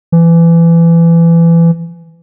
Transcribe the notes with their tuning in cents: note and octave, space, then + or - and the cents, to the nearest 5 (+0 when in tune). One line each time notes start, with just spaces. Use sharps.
E3 +25